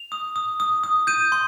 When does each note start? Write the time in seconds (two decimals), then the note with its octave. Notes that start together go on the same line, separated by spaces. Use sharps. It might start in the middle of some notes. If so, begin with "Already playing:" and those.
Already playing: F7
0.12 D#6
0.36 D#6
0.60 D#6
0.84 D#6
1.07 G6 D#7
1.32 C6